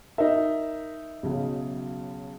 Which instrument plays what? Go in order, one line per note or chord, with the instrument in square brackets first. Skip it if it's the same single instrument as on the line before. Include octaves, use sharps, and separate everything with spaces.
[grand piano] D#4 E5 [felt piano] A#4
[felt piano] B1 C#3 F#3